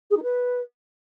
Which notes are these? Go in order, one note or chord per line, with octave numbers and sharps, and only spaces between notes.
G#4
D#4
B4